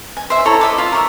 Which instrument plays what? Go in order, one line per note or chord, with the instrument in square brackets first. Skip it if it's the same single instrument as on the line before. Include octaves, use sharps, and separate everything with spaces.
[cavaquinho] G#5
C5 E5
E4 A4 C#5 A#5
D#5 E5 D6
F4
A#4 C#5 E5